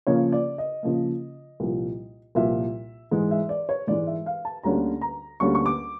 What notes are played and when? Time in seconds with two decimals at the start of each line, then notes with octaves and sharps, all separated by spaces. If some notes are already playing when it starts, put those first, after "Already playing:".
0.07 C#3 F3 A#3 C#5
0.32 D5
0.58 D#5
0.83 C#3 F3 A#3
1.60 C2 A#2 F3
2.35 C2 A#2 F3 E5
3.11 G#2 E3 G#3
3.31 E5
3.49 D5
3.69 C#5
3.87 G#2 E3 G#3 D5
4.07 E5
4.26 F5
4.45 A5
4.63 D2 D3 G3 A#3 C#4 A#5
5.01 A#5
5.40 D2 D3 G3 A#3 C#4 C#6
5.55 C#6
5.66 D6